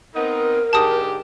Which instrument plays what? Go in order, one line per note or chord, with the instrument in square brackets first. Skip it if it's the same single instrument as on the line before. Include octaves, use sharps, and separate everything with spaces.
[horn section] B3 C4 D#4 [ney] A#4
[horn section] G#2 D3 G4 [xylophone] A5 D#6